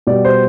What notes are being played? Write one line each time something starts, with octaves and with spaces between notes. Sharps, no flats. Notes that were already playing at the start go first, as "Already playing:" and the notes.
B2 G3 D5
C5